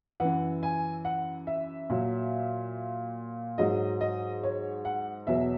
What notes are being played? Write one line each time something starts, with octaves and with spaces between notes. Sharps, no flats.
F#2 E3 F#5
G#5
F#5
E5
A#2 F#3
G#2 F#3 D#5
D#5
C#5
F#5
E2 B2 F#3 E5